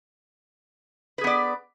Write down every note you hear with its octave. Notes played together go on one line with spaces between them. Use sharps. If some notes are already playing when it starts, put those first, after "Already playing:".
B3 G#4 B4 D5